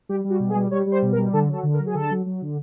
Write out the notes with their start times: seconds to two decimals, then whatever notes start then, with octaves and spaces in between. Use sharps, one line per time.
0.09 G3 G4
0.24 G3
0.30 F#4
0.40 B2
0.50 G#4
0.55 G3
0.71 G3 C#5
0.86 G3
0.92 C5
1.02 B2
1.12 A#4
1.17 G3
1.33 D3 A4
1.48 F#3 A4
1.63 D3
1.74 A#4
1.79 F#3
1.86 G#4
1.94 D3 A4
2.11 F#3
2.26 F#3
2.42 D3